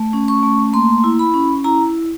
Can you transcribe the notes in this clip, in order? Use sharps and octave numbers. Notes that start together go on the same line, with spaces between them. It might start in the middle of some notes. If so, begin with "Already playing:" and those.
Already playing: A3
C#4
C#6
A3
A#3 C6
E4
B5
C#4
E4 A#5